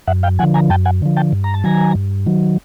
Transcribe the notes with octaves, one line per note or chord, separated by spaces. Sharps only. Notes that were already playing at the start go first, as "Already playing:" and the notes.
F#2 E5 F#5
F5 G5
D3 F3 F#5 G#5
G#5 A#5
F#2 G5 A5
F#5 G#5
D3 F3
G5 A5
G2
A#5
A5
D#3 F#3 G#5 A#5
G2
D#3 F#3